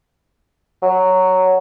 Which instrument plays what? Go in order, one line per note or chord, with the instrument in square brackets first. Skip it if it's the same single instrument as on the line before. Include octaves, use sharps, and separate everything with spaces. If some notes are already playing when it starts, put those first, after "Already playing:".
[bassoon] F#3